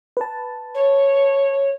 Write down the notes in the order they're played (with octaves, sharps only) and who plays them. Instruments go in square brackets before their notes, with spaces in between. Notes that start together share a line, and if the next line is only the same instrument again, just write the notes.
[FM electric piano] B4 A5
[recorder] C#5